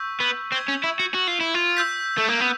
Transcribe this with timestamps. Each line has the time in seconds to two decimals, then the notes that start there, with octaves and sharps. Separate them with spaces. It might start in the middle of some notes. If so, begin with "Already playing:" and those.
Already playing: C#6 E6 G6 B6
0.20 B3
0.52 C4 C#6 E6 G#6
0.68 C#4
0.84 E4
1.00 F#4
1.15 F#4
1.28 F4
1.40 E4
1.54 F4
1.77 E6 G6 B6
2.18 A3
2.29 A#3
2.40 B3